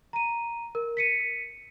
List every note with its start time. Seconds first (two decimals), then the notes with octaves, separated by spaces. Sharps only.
0.13 A#5 D#7
0.75 A#4
0.97 B6 C#7 D#7